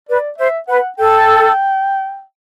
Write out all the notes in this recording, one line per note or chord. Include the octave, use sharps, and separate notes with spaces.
B4 D5
C5 E5
B4 F#5
A4 G5